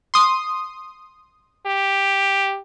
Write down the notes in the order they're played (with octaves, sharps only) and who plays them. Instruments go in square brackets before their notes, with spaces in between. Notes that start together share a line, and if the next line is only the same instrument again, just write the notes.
[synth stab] C6 D#6
[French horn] G4